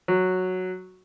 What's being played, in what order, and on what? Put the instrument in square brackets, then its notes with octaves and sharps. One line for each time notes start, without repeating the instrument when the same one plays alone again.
[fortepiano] F#3